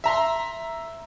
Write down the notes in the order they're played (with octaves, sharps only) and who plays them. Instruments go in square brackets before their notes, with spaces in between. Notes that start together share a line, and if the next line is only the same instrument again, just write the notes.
[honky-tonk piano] E5 A#5 C6